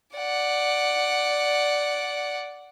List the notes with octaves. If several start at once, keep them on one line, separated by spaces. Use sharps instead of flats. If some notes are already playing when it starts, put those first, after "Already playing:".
D5 F#5